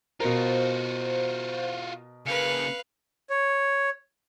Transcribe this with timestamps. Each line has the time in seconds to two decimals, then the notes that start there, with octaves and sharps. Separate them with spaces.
0.20 B2 F4 F#4 A#4 C5
2.26 C#3 A#3 B4 F5 C#7
3.30 C#5